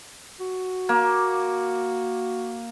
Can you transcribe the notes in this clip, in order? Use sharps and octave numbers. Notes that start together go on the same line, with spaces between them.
F#4
A#3